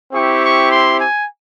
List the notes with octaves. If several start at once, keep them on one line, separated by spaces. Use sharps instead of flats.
C4 E4 G4 C#6
C#6
C6
G#5